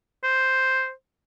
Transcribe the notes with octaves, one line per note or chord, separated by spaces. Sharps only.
C5